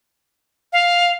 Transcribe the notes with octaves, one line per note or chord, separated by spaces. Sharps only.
F5